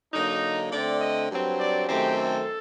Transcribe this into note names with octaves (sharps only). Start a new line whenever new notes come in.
D3 F#3 A#3 D#4
D3 A3 C4 D5
D#5
G2 F#3 C4
D5
F#2 D#3 A3 C4 G4
A4